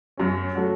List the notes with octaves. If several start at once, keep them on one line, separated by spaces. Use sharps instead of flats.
F#2 F#3 C#4
F#3 A3 F#4